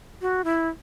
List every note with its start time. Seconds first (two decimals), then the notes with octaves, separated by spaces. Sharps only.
0.22 F#4
0.44 E4